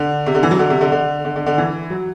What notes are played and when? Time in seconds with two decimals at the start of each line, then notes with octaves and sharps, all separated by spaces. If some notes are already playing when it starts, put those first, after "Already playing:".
Already playing: D3
0.26 C3
0.35 D3
0.43 E3
0.51 F#3
0.59 D3
0.70 C3
0.81 D3
0.92 D3
1.25 D3
1.36 D3
1.46 D3
1.58 E3
1.90 F#3